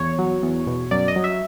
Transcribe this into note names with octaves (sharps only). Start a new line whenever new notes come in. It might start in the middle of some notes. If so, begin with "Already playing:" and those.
Already playing: E2 C#5
F#3
E2
B2
F#2 D5
D#5
F#3
E5